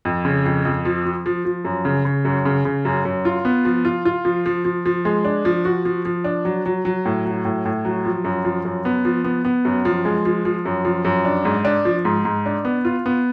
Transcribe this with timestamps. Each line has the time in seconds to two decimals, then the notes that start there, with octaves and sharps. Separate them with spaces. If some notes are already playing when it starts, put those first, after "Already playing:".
0.05 F2
0.25 C#3
0.45 F2
0.65 F2
0.85 F3
1.05 F3
1.26 F3
1.45 F3
1.65 F#2
1.85 C#3
2.05 C#3
2.25 F#2
2.45 C#3
2.65 C#3
2.85 F#2
3.05 F#2
3.25 F4
3.45 B3
3.65 F3
3.85 F4
4.05 F4
4.25 F3
4.46 F3
4.65 F3
4.85 F3
5.05 G#3
5.25 D4
5.45 F3
5.65 F#4
5.85 F3
6.05 F3
6.24 D4
6.45 F#3
6.66 F#3
6.85 F#3
7.05 A2
7.25 F#3
7.45 A2
7.65 A2
7.85 F#3
8.05 F3
8.24 F#2
8.45 F3
8.65 F#2
8.85 B3
9.05 F3
9.24 B3
9.45 B3
9.65 F#2
9.85 F3
10.05 G#3
10.25 F3
10.45 F3
10.65 F#2
10.85 F3
11.05 F#2
11.25 D4
11.45 G#2
11.65 D4
11.85 F3
12.05 G#2
12.25 G#2
12.46 D4
12.65 B3
12.85 F4
13.06 B3